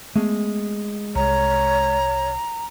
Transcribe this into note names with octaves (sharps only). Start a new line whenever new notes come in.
G#3 A3 B3
C2 C#5 A#5